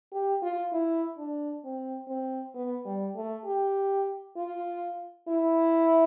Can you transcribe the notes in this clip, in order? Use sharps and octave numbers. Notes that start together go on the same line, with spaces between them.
G4
F4
E4
D4
C4
C4
B3
G3
A3
G4
F4
E4